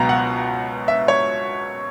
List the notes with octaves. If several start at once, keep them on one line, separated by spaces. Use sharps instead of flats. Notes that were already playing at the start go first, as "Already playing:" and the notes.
Already playing: C#2 B2 F#3 B3 A#5
F#5
E5
C#5